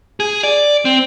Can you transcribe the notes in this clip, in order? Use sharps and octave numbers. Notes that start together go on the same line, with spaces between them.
G#4
D5
C4